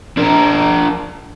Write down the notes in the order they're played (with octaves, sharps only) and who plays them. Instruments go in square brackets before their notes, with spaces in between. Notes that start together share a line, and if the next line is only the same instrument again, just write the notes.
[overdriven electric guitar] D4 A#4